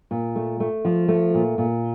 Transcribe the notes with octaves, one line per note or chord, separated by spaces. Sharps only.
A#2
A3
A3
F3
A3
A#2
A#2